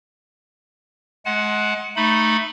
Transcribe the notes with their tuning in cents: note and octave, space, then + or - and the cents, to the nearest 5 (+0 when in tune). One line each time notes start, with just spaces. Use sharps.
G#3 +25 F#5 +0 A5 -45
A3 +0 D#4 +0 B5 +0